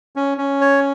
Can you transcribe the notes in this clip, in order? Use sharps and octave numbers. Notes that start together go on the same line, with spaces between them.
C#4
C#4
C#5